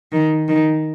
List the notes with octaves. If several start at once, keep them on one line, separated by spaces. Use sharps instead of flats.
D#3
D#3